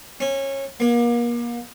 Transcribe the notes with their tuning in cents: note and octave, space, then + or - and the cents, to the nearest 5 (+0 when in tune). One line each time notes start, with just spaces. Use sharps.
C#4 -25
A#3 +35